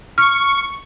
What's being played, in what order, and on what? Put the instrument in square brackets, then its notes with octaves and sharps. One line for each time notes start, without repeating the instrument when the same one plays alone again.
[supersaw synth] C#6 [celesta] F6